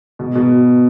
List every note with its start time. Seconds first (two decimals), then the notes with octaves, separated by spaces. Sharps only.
0.19 B2
0.35 B2